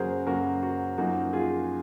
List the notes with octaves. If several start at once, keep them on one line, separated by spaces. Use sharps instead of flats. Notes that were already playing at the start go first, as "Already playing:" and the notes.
Already playing: F#2 C#3 F#3 A#3 F#4 G#4 A#4 C5
F#2 C#3 F#3 A#3 F#4 A#4
F#4
F#2 F3 A#3 D#4 F#4
F4 G#4